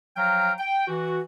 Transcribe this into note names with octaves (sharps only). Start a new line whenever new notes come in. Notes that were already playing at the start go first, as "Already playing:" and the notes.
F3 F#3 F5 G5 A#5 F6
G5
E3 F#4